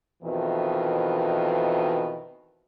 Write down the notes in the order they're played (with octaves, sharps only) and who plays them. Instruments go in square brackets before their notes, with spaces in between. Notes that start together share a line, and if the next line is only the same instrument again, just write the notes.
[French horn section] F2 B2 D#3 E3